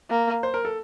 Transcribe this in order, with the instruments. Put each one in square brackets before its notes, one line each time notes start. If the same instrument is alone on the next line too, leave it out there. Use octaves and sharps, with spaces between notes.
[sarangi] A#3
[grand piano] C5
A#4
A4